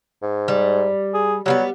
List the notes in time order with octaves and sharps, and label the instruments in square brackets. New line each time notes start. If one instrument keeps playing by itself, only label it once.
[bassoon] G#2
[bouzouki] G3
[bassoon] G#4
[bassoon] F#3 [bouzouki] G3 A#3 B3